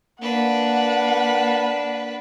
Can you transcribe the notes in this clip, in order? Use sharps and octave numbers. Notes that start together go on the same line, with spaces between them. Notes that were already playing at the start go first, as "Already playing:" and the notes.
A#3 D4 B4 F#5